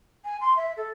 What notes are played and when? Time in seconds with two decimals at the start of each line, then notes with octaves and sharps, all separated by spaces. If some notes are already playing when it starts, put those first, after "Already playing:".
0.24 G#5
0.41 C6
0.56 E5
0.77 A4